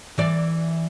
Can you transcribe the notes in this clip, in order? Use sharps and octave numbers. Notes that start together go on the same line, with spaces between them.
E3 D5